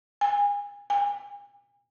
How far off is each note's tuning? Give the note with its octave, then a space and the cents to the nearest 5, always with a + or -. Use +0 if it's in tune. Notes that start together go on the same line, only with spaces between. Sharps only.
G#5 -35
G#5 -40